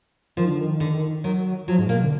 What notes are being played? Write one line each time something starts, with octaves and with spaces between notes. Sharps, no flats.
D#3 F3
D3
D#3
D3
D#3 F#3
F3 F#3
G#2
A#2 A#3
B2
D3